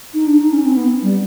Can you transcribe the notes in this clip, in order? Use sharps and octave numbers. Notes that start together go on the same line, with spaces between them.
D#4
D4
D#4
C#4
C4
B3
G3